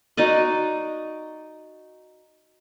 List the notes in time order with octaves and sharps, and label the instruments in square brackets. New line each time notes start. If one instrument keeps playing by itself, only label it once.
[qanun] D#4 F#4 D5 D#5